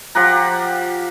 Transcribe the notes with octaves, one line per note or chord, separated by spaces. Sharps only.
F3 G4 F#5 A#5